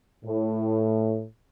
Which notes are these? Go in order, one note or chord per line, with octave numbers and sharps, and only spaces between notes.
A2